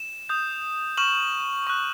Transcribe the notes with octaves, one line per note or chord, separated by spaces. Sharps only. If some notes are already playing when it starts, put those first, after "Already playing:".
Already playing: E7
D#6 G6
C#6 F6 E7 F#7
C#6 F#6